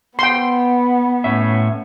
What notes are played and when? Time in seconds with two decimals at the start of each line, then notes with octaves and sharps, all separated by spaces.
0.19 B3 G5 C6
1.24 A2 C#4 E5